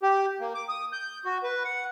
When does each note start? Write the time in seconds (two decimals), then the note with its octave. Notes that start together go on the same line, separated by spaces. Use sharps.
0.03 G4
0.40 A#3
0.55 D6
0.69 D#6
0.93 G6
1.25 F#4
1.43 B4
1.65 F#5